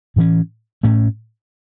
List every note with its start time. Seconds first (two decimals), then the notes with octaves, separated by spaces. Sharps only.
0.16 A2 E3 C#4
0.83 A2 A3 C#4